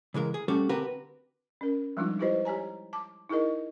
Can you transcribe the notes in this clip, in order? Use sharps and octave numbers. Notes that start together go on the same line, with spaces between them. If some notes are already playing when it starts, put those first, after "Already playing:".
C#3 E3 G#3 A#4
G#4
G3 A3 C#4 F#4 G4 A4
D3 C4 F#4 G4 A#4 B4
C#4 A#4
F3 G3 G#3 D4 D#4 F4
E4 F4 G4 B4 C5 D#5
G4 C#5 G#5 A#5
A5 D6
D#4 E4 G#4 A#4 D#5